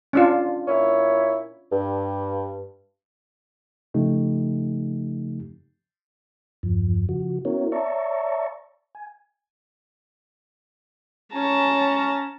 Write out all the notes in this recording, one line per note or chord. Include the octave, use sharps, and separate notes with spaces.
C#4 D4 F4
A#2 E4 C#5
G2
C#3 F3 A3 D#4 G4
E2 G2 F3
C#3 F3 F#4
B3 C#4 E4 F#4 A#4 C#5
C#5 D5 E5 A5 A#5 C#6
G#5
C#4 A5 A#5